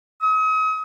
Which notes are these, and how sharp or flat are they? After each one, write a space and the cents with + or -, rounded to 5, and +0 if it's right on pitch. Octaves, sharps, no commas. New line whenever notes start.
D#6 +40